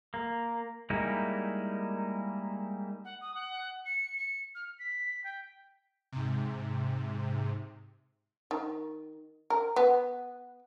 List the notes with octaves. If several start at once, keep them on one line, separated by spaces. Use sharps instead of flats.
A#3
G3 G#3 A#3 D#4 E4
F#5
D#6
F#5
C#7
C#7
F6
B6
G5
G#2 C3
D#3
A#4
B3